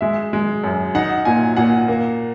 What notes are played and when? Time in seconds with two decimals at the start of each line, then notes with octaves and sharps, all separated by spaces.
0.01 G#3 E5
0.33 G#3
0.64 F#2
0.95 D#4 F#5
1.25 A#2 G#5
1.57 A#2 F#5
1.88 A#3